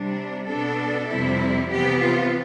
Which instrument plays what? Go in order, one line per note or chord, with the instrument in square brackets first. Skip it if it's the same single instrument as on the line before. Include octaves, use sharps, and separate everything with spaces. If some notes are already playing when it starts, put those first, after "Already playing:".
Already playing: [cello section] C3 G3 D4
B2 B3 D4 A4
F2 C3 G3 C4 E4
C3 E3 B3 G4
F4